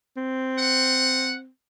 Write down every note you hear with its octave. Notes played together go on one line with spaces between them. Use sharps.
C4
F#5